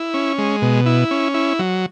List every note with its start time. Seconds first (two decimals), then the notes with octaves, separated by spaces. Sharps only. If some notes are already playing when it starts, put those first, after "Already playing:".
Already playing: E4
0.14 C#4
0.38 G#3
0.62 B2
0.86 E4
1.11 C#4
1.34 E4
1.59 F#3